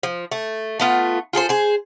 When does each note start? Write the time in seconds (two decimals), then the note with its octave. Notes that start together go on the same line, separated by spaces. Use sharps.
0.03 F3
0.32 A3
0.80 A3 B3 F4
1.33 F4 G#4 A4 C5
1.49 G#4 C5